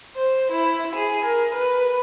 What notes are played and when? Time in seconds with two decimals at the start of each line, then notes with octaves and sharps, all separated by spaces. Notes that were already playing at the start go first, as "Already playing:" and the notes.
0.16 C5
0.52 E4
0.95 G#4
1.25 A#4
1.54 B4